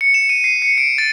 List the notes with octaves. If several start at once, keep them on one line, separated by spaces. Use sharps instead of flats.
C#7
E7
D#7
C7
C#7
D7
A6